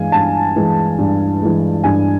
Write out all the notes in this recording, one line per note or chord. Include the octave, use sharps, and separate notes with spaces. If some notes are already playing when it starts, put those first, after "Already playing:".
Already playing: G2 E3 G#3 F5 G#5
G2 A5
E3 G#3
G2
E3 G#3
G2 G#5